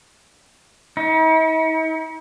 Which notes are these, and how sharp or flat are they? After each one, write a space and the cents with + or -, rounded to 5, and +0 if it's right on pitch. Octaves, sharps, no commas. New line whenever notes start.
D#4 +45